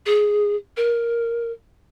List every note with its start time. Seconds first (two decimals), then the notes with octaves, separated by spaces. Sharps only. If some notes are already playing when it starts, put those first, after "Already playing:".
0.06 G#4
0.77 A#4